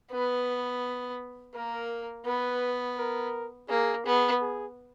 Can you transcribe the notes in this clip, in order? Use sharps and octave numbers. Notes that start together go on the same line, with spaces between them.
B3 B4
A#3 A#4
B3 B4
A#4
A#3 G#4
B3 G#4
G#4